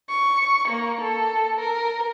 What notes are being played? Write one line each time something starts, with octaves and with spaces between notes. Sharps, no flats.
C#6
A#3
A4
A#4